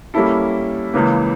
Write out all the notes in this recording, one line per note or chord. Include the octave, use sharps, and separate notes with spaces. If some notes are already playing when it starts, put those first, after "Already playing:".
G3 A#3 C#4 E4 A4
C#2 C#3 E3 A#3